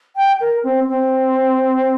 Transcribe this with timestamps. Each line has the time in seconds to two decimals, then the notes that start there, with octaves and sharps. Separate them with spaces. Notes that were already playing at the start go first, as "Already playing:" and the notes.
0.16 G5
0.41 A#4
0.63 C4
0.88 C4